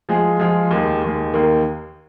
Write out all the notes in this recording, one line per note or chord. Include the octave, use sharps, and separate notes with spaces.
F3 G#3 F4 G#4
F3 G#3 F4 G#4
D#2 D#3 G#3
D#2 D#3 G#3
D#2 D#3 A#3